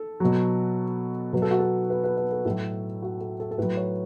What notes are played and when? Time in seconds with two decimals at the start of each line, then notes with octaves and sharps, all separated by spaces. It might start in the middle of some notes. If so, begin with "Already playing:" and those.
Already playing: A4
0.20 B2 F#3
1.33 B2 F#3 B4
1.42 A4
1.51 F#4
1.59 A4
1.90 B4
2.04 B4
2.17 B4
2.32 A4
2.45 A2 F#3 A4
3.02 F#4
3.21 A4
3.40 A4
3.51 A4
3.58 A2 F#3 B4
3.77 C#5